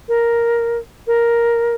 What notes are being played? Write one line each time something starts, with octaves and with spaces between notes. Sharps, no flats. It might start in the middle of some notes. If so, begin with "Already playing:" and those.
A#4
A#4